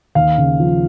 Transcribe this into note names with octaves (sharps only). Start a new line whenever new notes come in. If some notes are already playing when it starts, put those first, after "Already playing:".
D#2 F5
C#3
F3